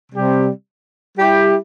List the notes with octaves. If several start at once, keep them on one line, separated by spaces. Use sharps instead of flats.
C3 G3 C4 G4
G3 E4 G4